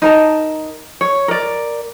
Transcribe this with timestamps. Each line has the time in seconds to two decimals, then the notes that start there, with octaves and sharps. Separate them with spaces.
0.02 D#4 A#4 A5
1.01 C#5
1.28 A#4 D5